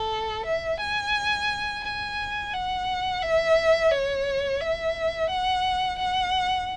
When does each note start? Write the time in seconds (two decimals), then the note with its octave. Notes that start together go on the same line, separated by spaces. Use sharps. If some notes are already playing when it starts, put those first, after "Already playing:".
Already playing: A4
0.46 E5
0.80 G#5
1.84 G#5
2.54 F#5
3.22 E5
3.91 C#5
4.61 E5
5.30 F#5
5.99 F#5